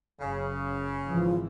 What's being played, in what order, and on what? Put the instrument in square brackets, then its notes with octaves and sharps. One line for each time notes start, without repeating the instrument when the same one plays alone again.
[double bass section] F#1 [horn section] C#3
[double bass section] G#1 G#2 E3 [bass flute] F3